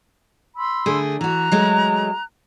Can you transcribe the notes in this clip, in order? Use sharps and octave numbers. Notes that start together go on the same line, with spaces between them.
B5 C6 E6
D3 A3 G#4
E3 F#4 A#5 F#6
F#3 G#3 A3